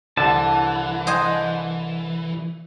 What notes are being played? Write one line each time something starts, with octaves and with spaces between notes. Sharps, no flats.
C2 D3 E3 A5
C5 D#5 G#5